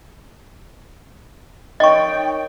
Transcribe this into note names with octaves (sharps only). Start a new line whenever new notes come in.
D#4 A#4 C#5 D#5 G5 C#6